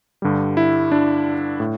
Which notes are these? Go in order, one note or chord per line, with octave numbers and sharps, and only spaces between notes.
G2 D3 G3
E4
D4
A2